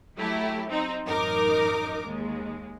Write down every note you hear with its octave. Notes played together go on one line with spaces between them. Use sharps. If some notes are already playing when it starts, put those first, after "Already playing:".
F#3 A3 E4 G4
C4 D#4
A1 F#2 D#4 A#4 D6
D#2 G#3